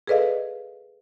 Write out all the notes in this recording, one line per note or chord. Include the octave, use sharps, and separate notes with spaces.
G#4 A4 B4 D5 D#5 F5